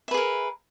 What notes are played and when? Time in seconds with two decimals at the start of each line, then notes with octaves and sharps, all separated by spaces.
0.08 E5
0.11 B4
0.14 G#4
0.17 A#4